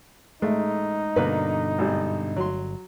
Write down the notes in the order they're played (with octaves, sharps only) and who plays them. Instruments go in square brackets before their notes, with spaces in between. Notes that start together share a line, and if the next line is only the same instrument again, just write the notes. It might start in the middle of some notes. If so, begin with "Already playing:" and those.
[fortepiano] A1 A3 [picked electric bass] G#3 [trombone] D#4
[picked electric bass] G2 B2 D3 [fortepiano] A#3 D4 B4
[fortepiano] G#1 G3
[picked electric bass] G1 [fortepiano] F#3 C6